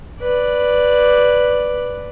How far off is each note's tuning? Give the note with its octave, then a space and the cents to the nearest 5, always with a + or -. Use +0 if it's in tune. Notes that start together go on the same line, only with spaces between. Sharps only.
B4 +0 D5 +0